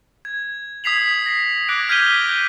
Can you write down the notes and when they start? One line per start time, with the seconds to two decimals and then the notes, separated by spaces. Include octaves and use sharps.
0.25 G#6
0.84 D#6 G#6 B6 C7 F7 F#7
1.26 A#6 C7
1.69 D6 F#6 G#6 A#6 D7
1.89 F6 G6 G#6 B6 D#7 G7